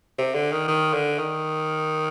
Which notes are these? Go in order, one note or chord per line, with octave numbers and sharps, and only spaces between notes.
C3
D3
D#3
D#3
D3
D#3